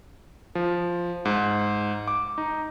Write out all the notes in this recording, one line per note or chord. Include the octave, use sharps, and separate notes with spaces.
F3
G#2
D6
D#4